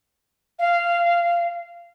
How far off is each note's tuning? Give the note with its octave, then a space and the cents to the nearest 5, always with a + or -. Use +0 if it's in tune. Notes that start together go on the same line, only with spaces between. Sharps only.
F5 -15